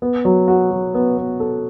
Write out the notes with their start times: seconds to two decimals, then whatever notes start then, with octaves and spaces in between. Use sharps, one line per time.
0.02 B3
0.25 F#3
0.48 F#4
0.71 F#3
0.95 B3
1.18 B3
1.40 A4